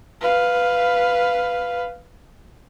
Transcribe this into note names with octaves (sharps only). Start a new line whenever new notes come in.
B4 F5